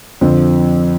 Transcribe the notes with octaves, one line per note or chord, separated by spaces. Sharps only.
F2 D3 F3 C4